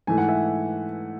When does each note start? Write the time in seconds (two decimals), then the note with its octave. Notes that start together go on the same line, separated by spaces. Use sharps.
0.07 G#2 E3 A3 G#5
0.18 F#5
0.28 E5 G#5